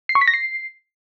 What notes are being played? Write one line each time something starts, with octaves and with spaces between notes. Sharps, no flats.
C7
C#6
B6
A#6
C7